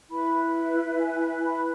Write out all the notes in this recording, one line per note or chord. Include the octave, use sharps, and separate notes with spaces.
E4 B4 B5
G#5
G#5
B5